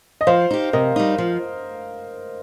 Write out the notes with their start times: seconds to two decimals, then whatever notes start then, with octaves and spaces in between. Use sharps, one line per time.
0.21 D#5
0.27 F3 C5 F5
0.51 D#4 G4
0.73 C3 A#4 D#5
0.96 G3 D#4
1.18 F3